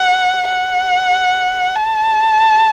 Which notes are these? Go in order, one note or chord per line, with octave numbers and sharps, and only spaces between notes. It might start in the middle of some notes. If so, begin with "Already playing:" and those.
Already playing: F#5
F#5
A5